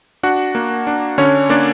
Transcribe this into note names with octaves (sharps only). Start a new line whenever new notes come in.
D4 F#4 F#5
A#3
D4
D3 C#4 C#5
A#3 D4 D5